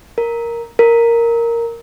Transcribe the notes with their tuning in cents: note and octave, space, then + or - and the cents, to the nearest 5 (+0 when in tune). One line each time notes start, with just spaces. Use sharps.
A#4 +0
A#4 -5